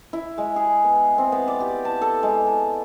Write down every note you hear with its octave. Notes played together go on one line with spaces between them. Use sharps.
E4
G#3
G#4
B3
C4
B3
D5
G4
A5
A4
G#3
A5